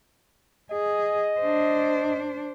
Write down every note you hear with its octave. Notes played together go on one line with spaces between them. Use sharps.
G#4 D#5
D4 C5